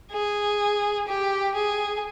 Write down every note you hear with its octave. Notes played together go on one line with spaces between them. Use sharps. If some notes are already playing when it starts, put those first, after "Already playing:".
G#4
G4
G#4